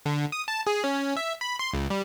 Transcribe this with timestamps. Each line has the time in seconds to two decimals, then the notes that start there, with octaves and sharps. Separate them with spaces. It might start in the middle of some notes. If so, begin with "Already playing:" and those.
0.06 D3
0.32 D#6
0.48 A5
0.67 G#4
0.84 C#4
1.17 E5
1.41 B5
1.59 C6
1.73 C#2
1.90 G3